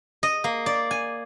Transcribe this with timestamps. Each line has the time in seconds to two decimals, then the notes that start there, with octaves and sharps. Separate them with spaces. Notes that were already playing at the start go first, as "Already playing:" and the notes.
0.23 D#5
0.44 A#3
0.66 D5
0.91 G#5